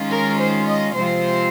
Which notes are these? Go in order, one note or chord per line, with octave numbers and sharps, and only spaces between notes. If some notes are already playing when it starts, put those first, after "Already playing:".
Already playing: D#3 G#3 C#4 F4
A#4
C5
D#5
C3 F3 G#3 C4 F4 C5